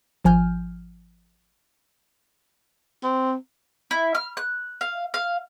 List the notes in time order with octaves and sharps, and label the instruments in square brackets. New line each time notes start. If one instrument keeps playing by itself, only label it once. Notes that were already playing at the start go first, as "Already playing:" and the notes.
[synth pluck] G#1 F3 G#5 F6 G6
[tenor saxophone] C4
[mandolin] E4
F6
F#6
F5
F5